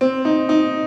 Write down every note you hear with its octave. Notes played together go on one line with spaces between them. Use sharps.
C4
D#4
D#4